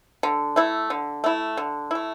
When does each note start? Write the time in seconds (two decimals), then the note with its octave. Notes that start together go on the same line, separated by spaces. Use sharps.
0.23 D3
0.56 A3 E4
0.90 D3
1.24 A3 E4
1.57 D3
1.91 A3 E4